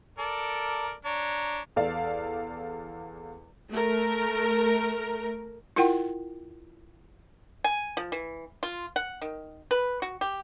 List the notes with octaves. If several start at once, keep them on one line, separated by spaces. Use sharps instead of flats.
A4 A#4 D5
D4 C#5 A#5
E2 A4 D5 F5
A3 A#4
E4 F4 A#4 F#5 G5
G#5
F3
E3
F4
F#5
D#3
B4
F#4
G4